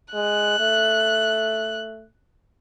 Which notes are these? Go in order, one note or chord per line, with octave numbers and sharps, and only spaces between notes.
G#3 F#6
A3